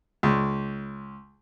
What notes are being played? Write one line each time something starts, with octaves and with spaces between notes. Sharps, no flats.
C#2